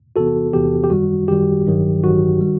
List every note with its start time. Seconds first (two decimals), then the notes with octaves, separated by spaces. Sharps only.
0.16 E2 C3 E3 B3 F#4 A4
0.53 E2 C3 E3 B3 G4
0.84 G4
0.90 F#2 D#3 G3 F#4
1.28 F#2 D#3 G3 G4
1.65 A1 G2 D#3 F#3
2.03 A1 G2 D#3 F#3 F#4
2.41 D#3 G3